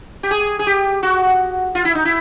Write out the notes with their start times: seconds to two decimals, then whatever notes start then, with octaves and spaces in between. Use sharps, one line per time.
0.23 G4
0.31 G#4
0.59 G#4
0.67 G4
1.03 F#4
1.75 F4
1.85 E4
1.95 D#4
2.05 E4